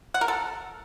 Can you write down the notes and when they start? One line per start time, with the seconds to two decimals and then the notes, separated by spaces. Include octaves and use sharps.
0.14 F#5
0.21 A#4
0.28 A4